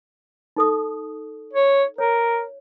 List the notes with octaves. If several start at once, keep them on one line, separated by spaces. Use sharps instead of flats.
D#4 A4 D#6
C#5
A#4 C#5